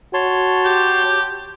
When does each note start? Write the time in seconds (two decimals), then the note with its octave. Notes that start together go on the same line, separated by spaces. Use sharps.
0.14 F#4 C#5 A5 C6
0.65 G4